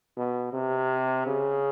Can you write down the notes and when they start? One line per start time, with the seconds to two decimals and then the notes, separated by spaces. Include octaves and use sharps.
0.17 B2
0.53 C3
1.26 C#3